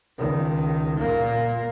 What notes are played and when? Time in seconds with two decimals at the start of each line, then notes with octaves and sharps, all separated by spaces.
0.19 C#2 D#3
0.98 A#2 A#3